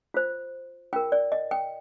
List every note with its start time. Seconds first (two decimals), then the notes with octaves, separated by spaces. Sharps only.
0.14 F4 C5
0.93 F4 A#4 G5
1.12 D5
1.32 D#5
1.51 G5